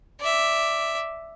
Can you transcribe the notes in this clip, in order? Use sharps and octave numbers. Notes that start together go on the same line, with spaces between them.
D5 E5